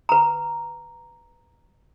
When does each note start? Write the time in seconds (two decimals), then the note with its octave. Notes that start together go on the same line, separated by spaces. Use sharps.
0.09 B4 A#5